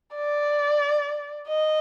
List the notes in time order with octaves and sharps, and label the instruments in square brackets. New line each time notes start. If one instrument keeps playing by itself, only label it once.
[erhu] D5
D#5